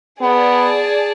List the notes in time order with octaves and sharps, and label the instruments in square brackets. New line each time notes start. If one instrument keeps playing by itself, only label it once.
[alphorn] B3 [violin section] G#4 D5 A5